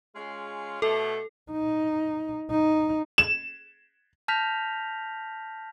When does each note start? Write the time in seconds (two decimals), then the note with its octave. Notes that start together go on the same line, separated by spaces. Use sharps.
0.16 G#3 C#4 F4
0.82 B2 A3 A4
1.51 D#4
2.51 D#4
3.18 E7
4.28 A5 F6 G6 A#6 B6 F7